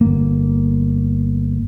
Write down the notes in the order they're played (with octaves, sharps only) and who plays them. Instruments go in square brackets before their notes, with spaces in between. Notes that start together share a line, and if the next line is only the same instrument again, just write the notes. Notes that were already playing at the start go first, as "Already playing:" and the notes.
[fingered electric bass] G1 A#3